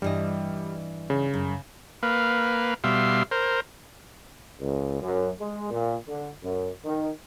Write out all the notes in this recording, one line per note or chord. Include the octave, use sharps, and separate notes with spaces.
G2 E3 G3 D#5
C#3
F#2
A#3 B4 F5
B2 G3 E5 F5 C6
A#4 C5
C#2
F#2
G#3
A#2
D3
F#2
D#3